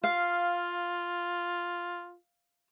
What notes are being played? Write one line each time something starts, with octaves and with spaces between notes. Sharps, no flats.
F4 F5